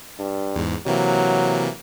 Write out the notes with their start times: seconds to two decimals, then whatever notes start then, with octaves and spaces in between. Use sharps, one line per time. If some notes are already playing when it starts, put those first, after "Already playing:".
0.19 G2
0.55 E2 G#2
0.86 C3 E3 F#3 A#3